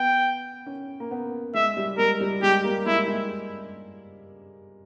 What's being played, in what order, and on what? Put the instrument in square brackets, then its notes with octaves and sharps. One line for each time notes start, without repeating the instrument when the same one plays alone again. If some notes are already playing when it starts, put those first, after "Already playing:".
Already playing: [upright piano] B3 [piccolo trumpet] G5
[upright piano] C#4
A#3
B3
[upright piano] G#3 [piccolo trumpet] E5
[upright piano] G3
[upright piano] G#3 [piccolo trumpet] A#4
[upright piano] G3
[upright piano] G#3 [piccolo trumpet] G4
[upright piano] A#3
[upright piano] G#3 [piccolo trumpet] E4
[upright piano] G#3